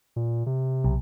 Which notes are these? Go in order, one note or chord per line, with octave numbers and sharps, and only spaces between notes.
A#2
C3
B1